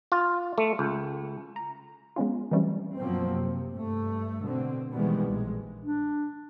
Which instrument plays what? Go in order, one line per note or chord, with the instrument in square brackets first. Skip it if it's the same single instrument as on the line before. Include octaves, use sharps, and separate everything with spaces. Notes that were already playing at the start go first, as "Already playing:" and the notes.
[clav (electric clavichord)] F4
A3
C#2
[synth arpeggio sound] A#5
G#3 B3 C#4 F4
E3 F#3 G3 A3 C4 C#4
[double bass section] F#2 B2 F3 F#3 A#3 C4
C3
G2 A3
B2 D3 C4
B2 D#3 E3 G3 G#3 B3
A#1 G#3
[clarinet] D4